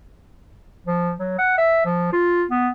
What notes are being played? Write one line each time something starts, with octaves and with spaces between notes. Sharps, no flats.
F3
F#3
F#5
E5
F3
F4
B3